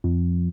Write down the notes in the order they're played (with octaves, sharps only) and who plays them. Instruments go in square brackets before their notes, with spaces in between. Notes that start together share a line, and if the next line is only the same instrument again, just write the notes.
[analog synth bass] F2